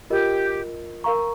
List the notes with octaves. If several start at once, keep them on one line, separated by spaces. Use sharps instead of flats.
F4 G4 A#4 D#5
A#4 F5 A#5 C#6